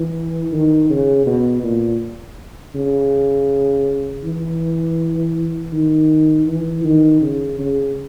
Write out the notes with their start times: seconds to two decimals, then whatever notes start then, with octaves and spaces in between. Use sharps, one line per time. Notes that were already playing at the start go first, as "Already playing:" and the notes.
Already playing: E3
0.52 D#3
0.89 C#3
1.26 B2
1.63 A#2
2.75 C#3
4.24 E3
5.73 D#3
6.47 E3
6.85 D#3
7.22 C#3
7.59 C#3